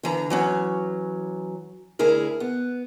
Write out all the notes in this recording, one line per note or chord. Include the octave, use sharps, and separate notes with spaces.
D3 E3 A#5
E3 F#3 C#4
D2 E4 G#4 A#4
B3